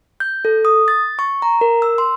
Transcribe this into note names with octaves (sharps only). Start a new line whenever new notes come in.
G6
A4
D#6
A6
C#6
A#5
A#4
E6
C6